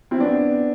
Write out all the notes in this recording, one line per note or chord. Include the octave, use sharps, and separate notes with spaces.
C4 E4
B3 D4